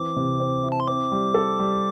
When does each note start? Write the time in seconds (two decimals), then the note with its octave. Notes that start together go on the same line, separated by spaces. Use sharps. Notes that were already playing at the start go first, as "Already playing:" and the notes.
Already playing: E3 C4 D6
0.16 C3
0.40 C4
0.63 E4
0.72 A5
0.80 C6
0.87 C4 D6
1.12 G3
1.34 A4
1.59 G3